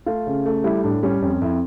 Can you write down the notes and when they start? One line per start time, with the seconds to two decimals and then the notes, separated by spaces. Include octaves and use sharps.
0.06 A3 F4
0.27 C#3
0.46 A3
0.64 G3 E4
0.84 A2 D4
1.03 G3 C#4
1.22 F2 C#4
1.42 F2 E4